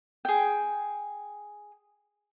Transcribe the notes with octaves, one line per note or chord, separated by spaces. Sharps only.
G#4 G5